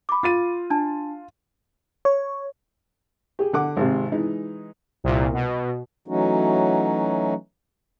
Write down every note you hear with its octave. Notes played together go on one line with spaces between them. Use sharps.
B5 D6
F4 A6 D#7
D4 A5
C#5
G4 G#4
D3 F#5 D6
G#1 C3
E3 G#3 D#4
C2 A#2
B2
E3 F#3 A3 C#4 D#4 F#4